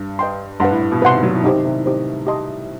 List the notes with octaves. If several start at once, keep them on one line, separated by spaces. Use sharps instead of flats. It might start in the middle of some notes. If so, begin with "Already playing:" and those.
Already playing: G2
B4 D#5 G5 C6
G2 B4 F#5 C6
A2
A2
B2
C3 B4 F#5 C6
D#3
F#3
E3
C3 D#4 G4 C5
D#3
C3
A2
D#4 G4 C5
G4 D#5 A5 C6